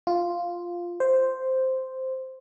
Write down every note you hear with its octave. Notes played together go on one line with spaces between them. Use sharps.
F4
C5